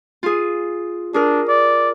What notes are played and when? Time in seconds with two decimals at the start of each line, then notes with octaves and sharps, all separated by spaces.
0.23 F4 G#4
1.14 D4 G#4 A#4
1.48 D5